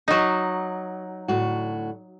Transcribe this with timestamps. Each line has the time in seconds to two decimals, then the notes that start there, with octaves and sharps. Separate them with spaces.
0.08 F#3 D#4
1.28 D2 A2 F#4